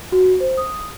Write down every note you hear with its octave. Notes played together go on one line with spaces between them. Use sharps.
F#4
C5
D#6